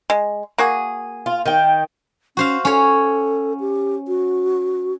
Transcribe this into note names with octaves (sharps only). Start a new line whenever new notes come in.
G#3
A#3 F#4 G#4
F4
D#3 G5
C#4 F#4 C5 F5
C#4 A4 C#5
G4
F#4